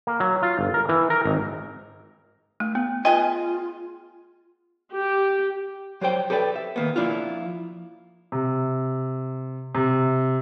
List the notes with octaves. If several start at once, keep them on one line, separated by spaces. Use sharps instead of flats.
A#3
F#3
F4
G1
A#4
E3
A#4
G#1
A3
B3
B3 F4 G#4 D#5 G5
G4
F#3 G3 C5 G5
G4 A4 B4 D5 G5
E5
D#3 A#3 B3
F3 A#3 D4 E4 F4
C3
C3